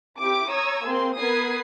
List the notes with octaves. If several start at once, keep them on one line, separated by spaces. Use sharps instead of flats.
C4 E4 G4 D6 D7
C#5 A#5 C#6 D#6 E6 G#6
A#3 C4 G#4 C6
B3 A#4 B5 D#6 G#6 C7